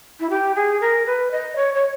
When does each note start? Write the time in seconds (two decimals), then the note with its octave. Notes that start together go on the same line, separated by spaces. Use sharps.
0.20 E4
0.30 G4
0.55 G#4
0.81 A#4
1.06 B4
1.31 D#5
1.56 C#5
1.74 C#5